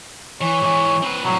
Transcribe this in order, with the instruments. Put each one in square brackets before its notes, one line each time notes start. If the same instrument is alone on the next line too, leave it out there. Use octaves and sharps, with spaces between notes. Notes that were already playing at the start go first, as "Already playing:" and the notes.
[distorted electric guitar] E3 [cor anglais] C#5
[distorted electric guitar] G#2 E3
C4 B4
[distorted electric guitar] C2 A2 [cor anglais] F#3